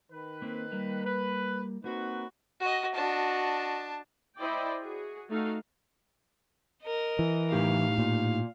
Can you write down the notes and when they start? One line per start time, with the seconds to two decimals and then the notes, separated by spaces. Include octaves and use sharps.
0.11 D#3 B4
0.42 A#3 C4
0.72 G3 A#3 A#4
1.05 B4
1.84 A#3 C4 D#4 F#4 B4
2.60 F#4 D#5
2.94 D4 F#4 D#5 A5
4.38 E4 C5 D5 D#5 G5
4.81 F#4 G#4
5.30 A3 D#4 F#4 A4 F5
6.83 A#4 D#5
7.19 E3
7.52 A2 D#4 G4 F5
7.98 A#2